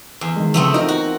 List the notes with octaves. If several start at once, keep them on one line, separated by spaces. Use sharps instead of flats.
E2
D#3 G#3
C#3 F3 A3 B3 C4
D#4 F4 A#4
F#4